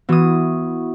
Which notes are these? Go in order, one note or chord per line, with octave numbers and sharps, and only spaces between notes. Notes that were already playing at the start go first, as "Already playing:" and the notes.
E3 B3 E4 F#4 D#6